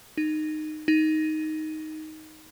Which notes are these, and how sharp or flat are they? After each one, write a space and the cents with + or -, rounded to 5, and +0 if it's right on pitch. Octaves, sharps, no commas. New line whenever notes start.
D#4 -15
D#4 +5